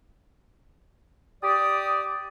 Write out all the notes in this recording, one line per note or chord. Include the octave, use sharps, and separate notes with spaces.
G4 D5 D#6